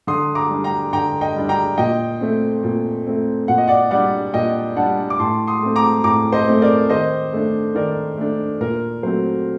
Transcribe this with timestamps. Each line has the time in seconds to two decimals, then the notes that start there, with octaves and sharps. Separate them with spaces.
0.07 D3 C6 D#6
0.35 A#5 D6
0.50 G3 D4
0.64 G5 A#5
0.93 D3 G5 A#5
1.21 D#5 G5
1.36 G3 D4
1.49 G5 A#5
1.78 A#2 D#5 G5
2.21 A3 C4
2.64 A#2
3.06 A3 C4
3.48 A#2 F#5
3.58 D#5
3.67 D5 F#5
3.91 G3 D4 D5 F#5
4.34 A#2 D#5 G5
4.76 G3 D4 F#5 A5
5.10 D6
5.19 A2 A5 C6
5.47 C6 D#6
5.63 A3 C4
5.76 A#5 D6
6.04 A2 A#5 D6
6.33 C5 D#5
6.47 A3 C4
6.62 A#4 D5
6.89 D#3 C5 D#5
7.33 A3 D4
7.75 D#3 A#4 D5
8.17 A3 D4
8.61 A#2 A#4
9.03 F#3 A3 C4 C5